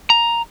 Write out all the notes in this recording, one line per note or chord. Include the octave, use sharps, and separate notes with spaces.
A#5